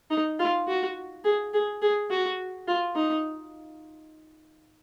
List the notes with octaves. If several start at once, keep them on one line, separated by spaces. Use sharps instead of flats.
D#4
F4
F#4
G#4
G#4
G#4
F#4
F4
D#4